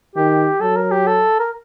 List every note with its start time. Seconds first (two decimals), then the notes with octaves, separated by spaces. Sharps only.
0.16 D#3 G4
0.61 F#3 A4
0.77 A#4
0.91 G4
1.07 A4
1.39 A#4